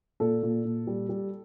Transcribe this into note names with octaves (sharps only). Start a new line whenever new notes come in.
A#2 A4
A#2
A#2
G3
G3